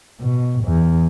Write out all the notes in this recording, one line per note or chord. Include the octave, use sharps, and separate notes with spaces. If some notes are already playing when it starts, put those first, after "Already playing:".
B2
E2